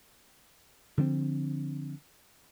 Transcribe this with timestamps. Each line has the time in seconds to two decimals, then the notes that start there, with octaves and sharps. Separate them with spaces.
0.97 D3 F3 A#3 C4